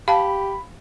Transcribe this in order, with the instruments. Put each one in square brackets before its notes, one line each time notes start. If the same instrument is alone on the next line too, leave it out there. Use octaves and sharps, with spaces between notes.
[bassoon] G4 [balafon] F5 A5 [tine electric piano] B5